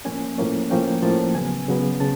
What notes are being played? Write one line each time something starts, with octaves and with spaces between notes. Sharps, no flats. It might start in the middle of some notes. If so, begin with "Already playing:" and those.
A2 F3 A#3 C#4 G#5
A2 F3 A#3 C#4
A2 F3 A#3 C#4 G5
A2 F3 A#3 C#4 A5
C#3 F#3 B3 G#5
C#3 F#3 B3
C#3 A5